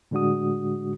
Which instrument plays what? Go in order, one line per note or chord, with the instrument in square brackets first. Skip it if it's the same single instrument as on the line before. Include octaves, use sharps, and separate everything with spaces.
[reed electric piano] A2 D3 G#3 D4 F#4 D#6